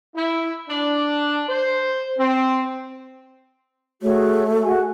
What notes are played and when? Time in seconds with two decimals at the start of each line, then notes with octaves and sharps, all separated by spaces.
0.16 E4
0.69 D4
1.49 C5
2.19 C4
4.02 A3 F#4 G#4 C#5
4.63 F#4 G#4 G#5